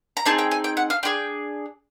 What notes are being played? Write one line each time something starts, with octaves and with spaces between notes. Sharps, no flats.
A#5
C4 D#4 G#4 A5
G5
G#5
G5
F#5
F5
D4 F4 G#4 G5